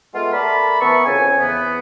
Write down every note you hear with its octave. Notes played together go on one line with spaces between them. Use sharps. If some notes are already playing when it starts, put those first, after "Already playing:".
G#3 A3 B3 F4
A3 A#4 D5 A5 B5
E3 B3 A#4 E5 A5 C#6
F2 C#3 C4 G#5
E2 B3